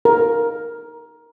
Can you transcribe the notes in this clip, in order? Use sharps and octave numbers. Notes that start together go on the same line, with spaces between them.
A#4